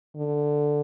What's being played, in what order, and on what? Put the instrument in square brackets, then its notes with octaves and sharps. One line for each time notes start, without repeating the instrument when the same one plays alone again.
[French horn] D3